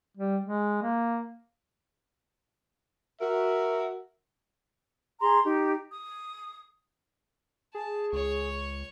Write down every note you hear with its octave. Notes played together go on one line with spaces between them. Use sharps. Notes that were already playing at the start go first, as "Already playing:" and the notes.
G3
G#3
A#3
F#4 A#4 E5
G#4 A#5 C6
D#4 G4
D#6
G#4 A5
C#2 C#5 C#6